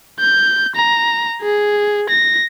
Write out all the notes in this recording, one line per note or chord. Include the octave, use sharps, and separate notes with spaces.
G6
A#5
G#4
A#6